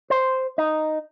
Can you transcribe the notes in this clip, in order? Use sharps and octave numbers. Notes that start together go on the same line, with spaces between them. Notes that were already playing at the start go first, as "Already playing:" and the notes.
C5
D#4